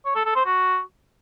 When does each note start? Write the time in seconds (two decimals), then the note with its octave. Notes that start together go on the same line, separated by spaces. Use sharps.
0.05 C#5
0.15 A4
0.25 A4
0.35 C5
0.45 F#4